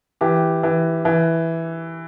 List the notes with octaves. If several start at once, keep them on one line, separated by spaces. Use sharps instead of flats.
E3 G4
E3
E3